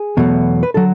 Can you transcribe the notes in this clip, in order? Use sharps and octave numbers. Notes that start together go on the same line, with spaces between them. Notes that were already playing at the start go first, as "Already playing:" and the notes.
Already playing: G#4
E2 B2 F#3 A3
B4
D3 F#3 A4